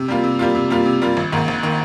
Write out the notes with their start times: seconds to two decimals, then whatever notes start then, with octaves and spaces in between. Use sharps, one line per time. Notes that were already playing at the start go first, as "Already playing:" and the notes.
Already playing: C3
0.08 G3 A#3 F4
0.24 C3
0.39 G3 A#3 F4
0.55 C3
0.70 G3 A#3 F4
0.86 C3
1.02 G3 A#3 F4
1.17 G#1
1.32 G#2 D#3 A#3
1.48 G#1
1.63 D#3 A#3